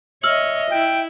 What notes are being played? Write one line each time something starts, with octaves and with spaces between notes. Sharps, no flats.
C#5 D#5 E5 E6 F6 F#7
E4 G5